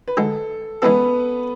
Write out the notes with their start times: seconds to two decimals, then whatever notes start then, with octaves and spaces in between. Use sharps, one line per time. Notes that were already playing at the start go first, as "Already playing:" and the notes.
0.08 B4
0.17 D2 D3 G#3 A4
0.82 E3 G#3 B3 C#4 E4 A4 B4